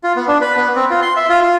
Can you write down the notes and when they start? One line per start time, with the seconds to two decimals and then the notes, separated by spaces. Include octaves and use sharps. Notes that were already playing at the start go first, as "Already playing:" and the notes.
0.03 F4
0.16 B3
0.28 D4
0.41 B4
0.56 B3
0.76 C4
0.90 F4
1.02 C6
1.16 E5
1.29 F4
1.42 F4